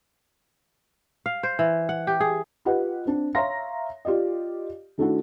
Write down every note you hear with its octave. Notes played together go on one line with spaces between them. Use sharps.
F5
C5
E3
F#5
G4
G#4
F4 G4 B4 D#5 F#5
C4 D4
C#5 E5 F5 A#5 C6 A#6
F4 G4 D5 D#5
D#3 A3 D4 E4 F#4